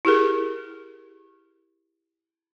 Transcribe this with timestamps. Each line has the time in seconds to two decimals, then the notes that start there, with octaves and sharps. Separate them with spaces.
0.05 E4 G4 G#4 A#4